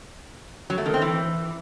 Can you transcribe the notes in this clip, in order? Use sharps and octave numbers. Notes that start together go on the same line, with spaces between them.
F#3
A3
D#3
C4
E3